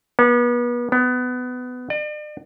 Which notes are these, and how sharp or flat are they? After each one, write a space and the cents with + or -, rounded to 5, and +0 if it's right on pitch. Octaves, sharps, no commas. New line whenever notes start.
B3 -35
B3 +20
D5 +40